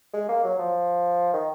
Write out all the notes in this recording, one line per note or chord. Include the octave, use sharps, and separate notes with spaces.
G#3
A#3
F#3
F3
D#3